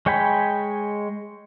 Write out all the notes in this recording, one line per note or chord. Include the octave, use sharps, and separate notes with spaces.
G#3 C#5 G5 G#5 B5